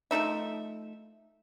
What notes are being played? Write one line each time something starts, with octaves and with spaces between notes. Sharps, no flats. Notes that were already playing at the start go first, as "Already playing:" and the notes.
F3 A3 D#4 E5